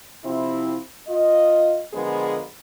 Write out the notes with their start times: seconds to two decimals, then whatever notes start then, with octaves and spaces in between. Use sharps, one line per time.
0.25 C3 F3 C4 E4
1.08 F4 D#5
1.93 D3 F3 G#3 B3 G#4 A#4